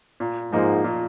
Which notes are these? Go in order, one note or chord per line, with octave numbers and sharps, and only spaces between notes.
A#2
G#2 F3 A#3 D#4
A#2